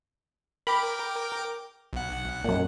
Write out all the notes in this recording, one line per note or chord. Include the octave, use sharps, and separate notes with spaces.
A#4 G5 B5 D6
B1 F#5
F#2 A#2